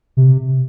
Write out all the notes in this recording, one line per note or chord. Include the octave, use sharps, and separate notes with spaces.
C3